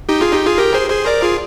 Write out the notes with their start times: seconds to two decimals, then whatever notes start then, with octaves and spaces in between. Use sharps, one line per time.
0.09 D#4 G4
0.21 F4 G#4
0.33 D#4 G4
0.45 F4 G#4
0.58 G4 A#4
0.74 G#4 C5
0.90 G#4 C5
1.06 A#4 D5
1.22 F4 G#4